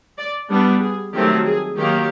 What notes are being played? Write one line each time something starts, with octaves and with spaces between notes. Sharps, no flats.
D5
G3 B3 D4
G#4
D#3 F#3 A3 C4 G4
G#4
D#3 F#3 A#3 G4